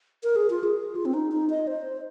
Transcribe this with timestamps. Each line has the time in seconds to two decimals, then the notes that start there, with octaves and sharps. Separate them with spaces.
0.23 A#4
0.36 G#4
0.50 F4
0.63 G#4
0.96 F4
1.05 C4
1.14 D#4
1.32 D#4
1.50 D#5
1.67 C5